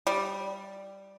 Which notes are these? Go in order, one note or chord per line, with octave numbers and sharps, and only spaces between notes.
G3